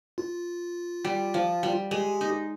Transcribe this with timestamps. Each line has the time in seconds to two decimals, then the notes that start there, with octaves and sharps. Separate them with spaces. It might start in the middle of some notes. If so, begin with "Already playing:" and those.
0.18 F4
1.05 G3
1.34 F3
1.63 G3
1.91 G#3 G4
2.21 D#4